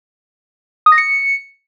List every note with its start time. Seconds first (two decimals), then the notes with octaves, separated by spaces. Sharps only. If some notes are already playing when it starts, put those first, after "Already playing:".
0.86 D#6
0.92 A#6
0.98 C#7